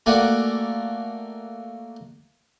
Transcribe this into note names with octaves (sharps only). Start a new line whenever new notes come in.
A3 A#3 F#4 D5 F#5 G#5